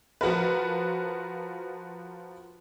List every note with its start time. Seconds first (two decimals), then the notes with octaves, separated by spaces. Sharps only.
0.21 F3 F#4 A#4 B4